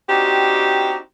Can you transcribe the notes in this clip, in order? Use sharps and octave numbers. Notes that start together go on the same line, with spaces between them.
C4 D4 D#4 F#4 G4